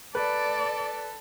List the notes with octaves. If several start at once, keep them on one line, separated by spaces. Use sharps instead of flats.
A4 B4 D5